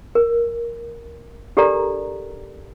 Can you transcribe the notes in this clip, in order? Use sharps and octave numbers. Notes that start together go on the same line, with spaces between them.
A#4
D4 G4 A4 A#4 D5 A#5